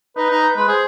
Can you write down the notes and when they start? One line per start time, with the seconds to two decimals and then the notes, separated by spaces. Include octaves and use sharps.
0.16 D#4 B4
0.30 D#4
0.42 B4
0.57 G#3 B4
0.68 G#4 C5